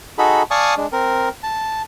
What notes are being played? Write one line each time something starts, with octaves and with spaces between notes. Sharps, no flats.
D#4 F#4 G#4 A4 B5
D5 F5 G#5 A5 C#6 D#6
G#3 D4
C4 A#4
A5